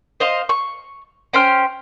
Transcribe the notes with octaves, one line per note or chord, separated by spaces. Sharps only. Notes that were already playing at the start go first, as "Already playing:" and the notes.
C5 D#5 F5
C#6
C#4 C5 G5 F6